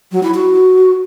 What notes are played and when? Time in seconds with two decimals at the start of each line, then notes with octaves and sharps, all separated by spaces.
0.12 F#3
0.23 E4
0.34 F#4